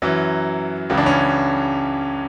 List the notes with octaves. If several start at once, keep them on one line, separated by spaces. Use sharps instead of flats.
F#2 E3 F#3
C#2 C#3 E3
D4
C#4